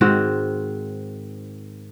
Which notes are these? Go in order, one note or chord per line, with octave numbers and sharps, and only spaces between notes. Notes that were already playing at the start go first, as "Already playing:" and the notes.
G#2 D#3 C4 F#4